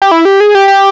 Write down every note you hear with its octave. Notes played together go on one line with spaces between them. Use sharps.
G4
E4
G4
G#4
G4
G4